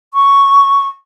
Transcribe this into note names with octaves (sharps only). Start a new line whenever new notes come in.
C#6